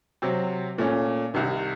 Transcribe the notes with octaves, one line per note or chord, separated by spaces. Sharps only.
C3 F#3 C4
A#2 A3 C#4
C2 C3 D#3